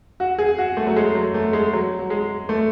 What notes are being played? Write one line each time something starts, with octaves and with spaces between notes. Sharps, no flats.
F#4
G#4
F#4
A3
F#3
G#3
F#3
A3
G#3
F#3
F#3
G#3
A3